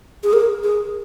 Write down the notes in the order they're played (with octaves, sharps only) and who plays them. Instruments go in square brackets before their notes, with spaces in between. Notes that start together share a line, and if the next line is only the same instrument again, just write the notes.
[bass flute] G#4
A#4
G#4